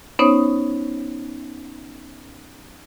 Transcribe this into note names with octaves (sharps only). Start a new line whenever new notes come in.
B3 C#4 D#4 C5 C#5 D#6